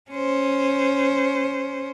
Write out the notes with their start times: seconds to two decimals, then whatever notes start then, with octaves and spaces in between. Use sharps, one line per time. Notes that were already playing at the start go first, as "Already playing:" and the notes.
0.11 C#4 C5